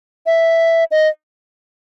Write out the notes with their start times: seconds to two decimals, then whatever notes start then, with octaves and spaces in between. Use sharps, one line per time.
0.26 E5
0.91 D#5